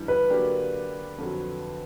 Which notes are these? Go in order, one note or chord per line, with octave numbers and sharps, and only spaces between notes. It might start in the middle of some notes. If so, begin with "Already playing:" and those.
Already playing: G2 E3 G3
B4
D3 F#3 A#3 D4 G4
F2 D3 F#3